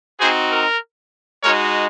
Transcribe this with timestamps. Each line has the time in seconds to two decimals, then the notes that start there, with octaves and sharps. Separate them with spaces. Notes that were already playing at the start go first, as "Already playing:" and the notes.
0.20 C4 D#4 F#4 G#4 C5
0.51 A#4
1.43 G#3 D#4 F#4 A#4 C#5